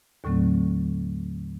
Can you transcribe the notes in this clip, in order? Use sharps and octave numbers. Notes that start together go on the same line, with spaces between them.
D#2 A2 D3 F#3 A3 C4